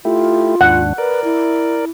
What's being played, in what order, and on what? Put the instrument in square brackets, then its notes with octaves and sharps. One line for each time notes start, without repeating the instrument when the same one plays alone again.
[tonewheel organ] A3 E4 G4 [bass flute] F4
[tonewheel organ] D#2 G#2 D4 [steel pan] F#5
[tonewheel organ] A#4 D5 [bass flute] B4
[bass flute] E4